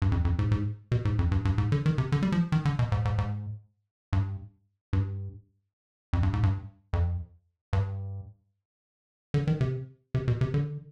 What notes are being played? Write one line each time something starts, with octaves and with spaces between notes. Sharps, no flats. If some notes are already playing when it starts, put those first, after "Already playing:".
G2
F2
F2
G#2
G#2
B2
G#2
F2
G2
G2
G#2
D3
D#3
C3
D3
G3
F3
D#3
D3
B2
G#2
G#2
G#2
G2
G2
F2
G2
G#2
G2
F2
G2
D3
D#3
C3
C3
B2
C3
D3